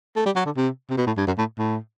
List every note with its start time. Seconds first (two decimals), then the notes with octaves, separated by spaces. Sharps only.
0.16 A3
0.26 G3
0.36 F#3
0.46 D3
0.56 C3
0.90 C3
0.97 B2
1.07 A2
1.17 G2
1.27 F#2
1.38 A2
1.58 A2